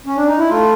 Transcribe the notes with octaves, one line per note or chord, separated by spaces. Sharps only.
C#4
D4
D#4
E4
A3 F4